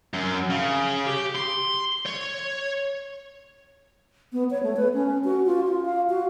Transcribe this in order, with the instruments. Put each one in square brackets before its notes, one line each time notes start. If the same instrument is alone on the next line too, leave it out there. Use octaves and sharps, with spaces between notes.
[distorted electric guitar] F#2
C#3
G4
C6
C#5
[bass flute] B3
C#5
A3
B4
C#4
F#4
F4
F4
F5
F#4